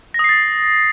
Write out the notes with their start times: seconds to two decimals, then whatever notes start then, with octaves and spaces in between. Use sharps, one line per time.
0.14 A#6
0.19 D#6
0.24 C7
0.29 A6